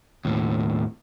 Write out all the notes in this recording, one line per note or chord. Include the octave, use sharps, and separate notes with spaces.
D#2 A2